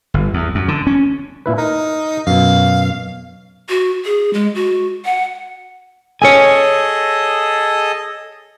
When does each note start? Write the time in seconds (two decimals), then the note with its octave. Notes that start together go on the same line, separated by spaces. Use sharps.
0.14 G1
0.34 E2
0.55 F#2
0.68 D3
0.87 C#4
1.46 A#2 E4 B4
1.58 D#4 A#4
2.27 F#2 B2 F5
3.69 F#4
4.05 G#4
4.34 G#3
4.55 F#4
5.05 F#5
6.22 G#4 A4 C#5 D#5 G#5